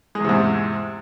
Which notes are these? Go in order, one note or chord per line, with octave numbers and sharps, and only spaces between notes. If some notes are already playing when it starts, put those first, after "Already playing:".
E2 G#2 C3 G#3